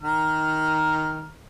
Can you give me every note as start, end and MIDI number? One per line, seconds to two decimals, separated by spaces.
0.03 1.30 51
0.03 1.30 82
0.03 1.30 89